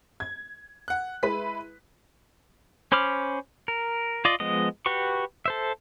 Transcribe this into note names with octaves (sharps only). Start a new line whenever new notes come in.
G#6
F#5 F#6
G#3 E4 B4 B6
C#4 C5 B5 D6 F6
A#4
F4 D5 D#5
F3 G#3 B3 D#5
F#4 G4 B4 C#6
A4 C5 E5